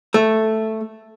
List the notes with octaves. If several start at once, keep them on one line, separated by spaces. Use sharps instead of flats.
A3